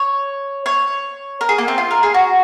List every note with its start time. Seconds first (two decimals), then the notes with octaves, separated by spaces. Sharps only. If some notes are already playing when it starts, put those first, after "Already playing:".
Already playing: C#5
0.66 C#5
1.41 A#4
1.49 G#4
1.58 A#3
1.68 C4
1.78 F4
1.91 A#4
2.03 G#4
2.14 F#4